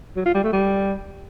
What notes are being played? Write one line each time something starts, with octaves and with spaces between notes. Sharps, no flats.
F#3
F4
G3
A3
G3